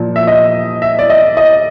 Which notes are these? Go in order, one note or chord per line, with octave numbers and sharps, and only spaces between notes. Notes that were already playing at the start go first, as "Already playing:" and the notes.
Already playing: A#2 F3
E5
D#5
E5
D5
D#5
D#5